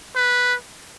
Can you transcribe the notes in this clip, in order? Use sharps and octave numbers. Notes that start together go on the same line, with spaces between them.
B4